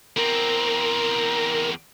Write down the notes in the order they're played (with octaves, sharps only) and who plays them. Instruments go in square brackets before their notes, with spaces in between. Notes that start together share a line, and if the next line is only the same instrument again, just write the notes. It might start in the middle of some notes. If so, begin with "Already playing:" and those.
[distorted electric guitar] E2 C4 [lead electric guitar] A#4